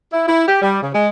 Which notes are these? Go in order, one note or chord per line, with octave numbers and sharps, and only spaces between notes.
E4
E4
G4
G3
C#3
G#3